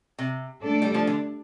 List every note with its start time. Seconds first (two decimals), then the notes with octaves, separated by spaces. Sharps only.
0.19 C3
0.63 A3 D4 A4 D5
0.82 G3
0.94 F3
1.07 D3